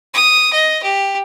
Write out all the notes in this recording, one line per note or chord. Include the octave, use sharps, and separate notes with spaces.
D#6
D#5
G4